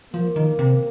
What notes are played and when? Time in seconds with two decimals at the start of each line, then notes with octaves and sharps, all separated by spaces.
0.13 F3 A#3
0.36 D#3
0.59 C3